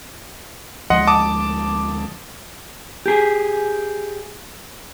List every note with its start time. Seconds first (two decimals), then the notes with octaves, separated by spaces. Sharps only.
0.90 D2 F3 G#3 D#5 F#5 C6
1.07 A5 D6 D#6
3.06 G4 G#4